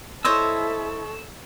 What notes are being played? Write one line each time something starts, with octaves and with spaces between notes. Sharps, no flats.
E4 A4 C5 C#5 D#5 E6